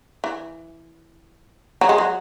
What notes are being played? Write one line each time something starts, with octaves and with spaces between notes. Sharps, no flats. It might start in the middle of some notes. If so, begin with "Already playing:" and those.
E3
F#3
G#3
F#3